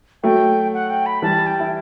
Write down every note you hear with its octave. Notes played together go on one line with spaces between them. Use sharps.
F#3 A3 G5
F#5
G5
B5
E3 G3 A5
G5
E4